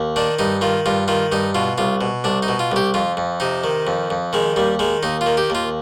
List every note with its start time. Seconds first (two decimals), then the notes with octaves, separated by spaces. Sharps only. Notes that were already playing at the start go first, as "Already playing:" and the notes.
Already playing: D#2
0.16 D#3 D4
0.39 G2 D#4
0.61 D#3 F4
0.86 G2 F4
1.08 D#3 F4
1.32 G2 D#4
1.55 B2 F4
1.78 C2 F4
2.01 B2
2.24 C2 D4
2.43 D#4
2.48 B2
2.59 F4
2.72 C2 G4
2.94 F2 F4
3.17 F2
3.40 C3 D#4
3.64 D#3
3.87 F2
4.10 F2
4.33 D#3 G#3
4.56 D#2 G3
4.79 D#3 G#3
5.03 D#2 D#4
5.21 F4
5.26 D#3
5.37 G4
5.50 D#2 F4